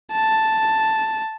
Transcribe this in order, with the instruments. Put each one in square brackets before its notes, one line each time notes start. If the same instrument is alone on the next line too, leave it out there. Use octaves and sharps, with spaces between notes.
[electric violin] A5